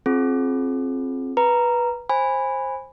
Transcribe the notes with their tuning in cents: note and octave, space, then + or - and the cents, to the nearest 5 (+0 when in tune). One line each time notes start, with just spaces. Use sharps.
C4 +20 F4 +0 G#4 +35
B4 -15 A#5 +0
C5 +15 G#5 -15 B5 +0